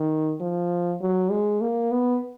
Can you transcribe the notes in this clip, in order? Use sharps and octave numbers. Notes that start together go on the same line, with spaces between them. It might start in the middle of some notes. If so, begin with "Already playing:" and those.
Already playing: D#3
F3
F#3
G#3
A#3
B3